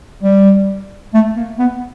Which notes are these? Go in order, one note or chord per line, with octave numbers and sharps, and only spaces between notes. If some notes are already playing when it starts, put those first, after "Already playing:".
G3
A3
A#3
B3